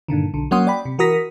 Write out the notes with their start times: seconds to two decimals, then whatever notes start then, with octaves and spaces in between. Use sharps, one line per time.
0.08 G2 A#2 D3 D#3
0.34 B1 D3
0.51 F#3 A#3 C#4 F#5 C6 D#6
0.67 D5 G5 B5
0.85 C3
0.99 E3 F#4 A#4 D#6 A#6 B6